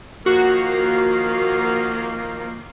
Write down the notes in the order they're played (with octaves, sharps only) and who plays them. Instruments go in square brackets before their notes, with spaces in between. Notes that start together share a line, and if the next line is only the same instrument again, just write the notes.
[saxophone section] D#3 F3 A#3 [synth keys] F#4